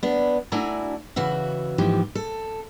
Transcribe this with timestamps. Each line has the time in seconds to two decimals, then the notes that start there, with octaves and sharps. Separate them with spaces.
0.03 B3 D4
0.52 A3 D4 E4 F#4 G#5 A#5
1.16 C#3 E3 F#4 E5
1.78 D#2 G#2 E3 F3 G4
2.15 A4